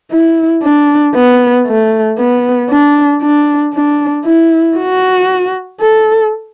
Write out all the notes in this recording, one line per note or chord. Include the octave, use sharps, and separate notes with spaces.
E4
D4
B3
A3
B3
D4
D4
D4
E4
F#4
A4